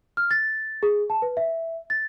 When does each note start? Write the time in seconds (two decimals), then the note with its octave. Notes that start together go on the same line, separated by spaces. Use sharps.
0.17 F6
0.31 A6
0.83 G#4
1.10 A5
1.22 B4
1.37 E5
1.90 A6